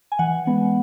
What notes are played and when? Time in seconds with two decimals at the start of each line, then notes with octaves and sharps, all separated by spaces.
0.12 G#5
0.19 E3 F#5
0.47 G#3 B3